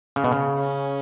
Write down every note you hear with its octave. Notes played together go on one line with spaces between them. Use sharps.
C#3
B2
C#3
C#4